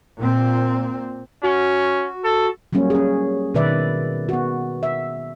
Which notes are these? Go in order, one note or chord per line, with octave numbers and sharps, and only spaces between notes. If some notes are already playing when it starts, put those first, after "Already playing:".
A#2 C4
C#4 F#4
A4
F#3 G3 A#3 C#4
C#4 G#4
B2 D#3 B4 D5 E5
B3 F#4
E5